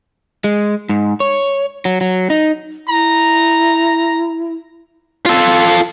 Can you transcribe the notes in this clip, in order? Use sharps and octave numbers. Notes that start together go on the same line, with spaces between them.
G#3
G#2
C#5
F#3
F#3
D#4
E4 A#5
F4 A4